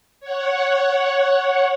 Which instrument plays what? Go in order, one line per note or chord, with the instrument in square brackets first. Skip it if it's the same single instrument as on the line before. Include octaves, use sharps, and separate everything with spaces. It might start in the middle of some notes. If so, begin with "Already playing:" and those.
[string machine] C#5 F#5